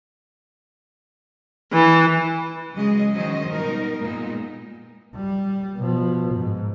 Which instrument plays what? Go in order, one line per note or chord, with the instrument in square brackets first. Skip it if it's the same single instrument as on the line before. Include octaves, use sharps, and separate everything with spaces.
[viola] E3
[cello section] C#3 F#3 G#3 G#4 D#5
D#3 F#3 C#4 C5 D#5
B2 G3 D#4 A#4
A#2 G#3 B3 D#4
[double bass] G3
B2 F3
G#2